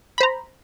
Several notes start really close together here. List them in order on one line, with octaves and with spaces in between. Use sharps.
B5 C5 A#5